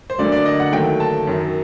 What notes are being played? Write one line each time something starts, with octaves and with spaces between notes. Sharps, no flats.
C5
D2 D3 F#3 A#3 D5
D5
D#5
F#5
D#2 D#3 F#3 A3 G5
A5
F#2 D#3 F#3